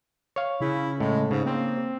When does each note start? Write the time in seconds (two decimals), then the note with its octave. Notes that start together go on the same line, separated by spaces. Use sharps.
0.36 C#5 F5
0.61 C#3 E4
1.00 A2 G#3
1.31 G#2 C#3
1.46 A#3 C4